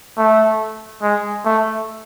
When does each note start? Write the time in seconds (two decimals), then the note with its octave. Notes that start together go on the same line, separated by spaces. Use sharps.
0.18 A3
1.03 G#3
1.45 A3